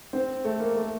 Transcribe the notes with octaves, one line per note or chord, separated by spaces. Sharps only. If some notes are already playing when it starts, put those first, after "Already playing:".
C4
A3
A#3
A3